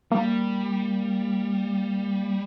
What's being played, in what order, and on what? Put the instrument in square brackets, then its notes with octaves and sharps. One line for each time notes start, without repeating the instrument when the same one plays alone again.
[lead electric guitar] G3 [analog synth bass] A#3